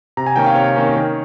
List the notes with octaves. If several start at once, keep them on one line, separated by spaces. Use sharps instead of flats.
C3 A#5
G#5
D#3 A#3 C#4 G5
F5
C3 C#5
D#3 A#3 C#4
D#3